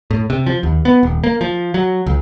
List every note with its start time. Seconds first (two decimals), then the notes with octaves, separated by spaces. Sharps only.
0.11 A2
0.30 C3
0.47 F3
0.63 D#2
0.85 B3
1.03 D#1
1.24 A#3
1.41 F3
1.74 F#3
2.06 C#2